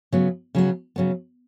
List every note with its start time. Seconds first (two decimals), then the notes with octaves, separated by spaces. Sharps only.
0.12 C#3 F#3 B3
0.55 C#3 F#3 B3
0.96 C#3 F#3 B3